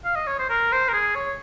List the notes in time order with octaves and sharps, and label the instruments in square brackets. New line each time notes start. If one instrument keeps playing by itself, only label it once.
[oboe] F5
D#5
C#5
C5
A#4
C5
A#4
G#4
C#5